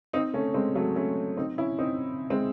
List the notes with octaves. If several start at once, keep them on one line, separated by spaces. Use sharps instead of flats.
C4 D#4
A3 C#4
G#3 C4
F#3 A3
A3 C#4
C4 D#4
C#4 E4
C4 D#4
G#3 C4